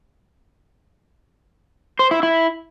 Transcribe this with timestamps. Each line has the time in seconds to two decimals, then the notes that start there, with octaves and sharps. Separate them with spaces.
1.99 C5
2.11 E4
2.23 E4